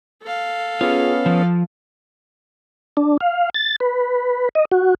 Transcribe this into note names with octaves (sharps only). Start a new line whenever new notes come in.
A4 F5
B3 C#4 F4 G#4
F3
D4
F5
A6
B4
D#5
F#4